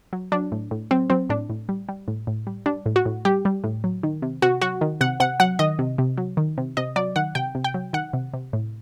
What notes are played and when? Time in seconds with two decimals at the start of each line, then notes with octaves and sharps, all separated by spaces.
0.13 F#3
0.32 F#3 D4
0.52 A2
0.71 A2
0.91 F#3 C4
1.10 F#3 C4
1.30 A2 D4
1.50 A2
1.69 G3
1.89 G3
2.08 A2
2.27 A2
2.47 G3
2.66 G3 D4
2.86 A2
2.96 F#4
3.05 A2
3.25 G3 G4
3.45 G3
3.64 A2
3.84 F#3
4.03 D#3
4.22 C3
4.42 C3 F#4
4.62 F#3 F#4
4.81 D#3
5.01 C3 F#5
5.20 C3 F#5
5.40 F#3 F#5
5.59 D#3 D#5
5.79 C3
5.98 C3
6.18 F#3
6.37 D#3
6.58 C3
6.77 C3 D#5
6.96 F#3 D5
7.16 D#3 F#5
7.35 C3 G5
7.55 C3
7.64 G5
7.74 F#3
7.93 D#3 F#5
8.13 C3
8.34 C3
8.53 A2